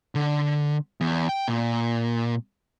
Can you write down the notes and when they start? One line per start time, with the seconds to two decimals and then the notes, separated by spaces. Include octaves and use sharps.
0.15 D3
1.01 E2
1.29 G5
1.48 A#2